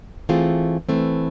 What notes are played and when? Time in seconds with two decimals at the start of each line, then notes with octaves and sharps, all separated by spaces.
0.29 E3 A3 C4 F4 G#4
0.89 E3 A3 C4